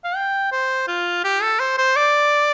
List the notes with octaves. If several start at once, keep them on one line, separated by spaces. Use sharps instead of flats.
F5
G5
C5
F4
G4
A4
C5
C5
D5